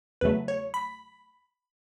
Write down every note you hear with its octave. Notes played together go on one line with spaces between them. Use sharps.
E2 C#3 F#3 A3 B4
C#5
B5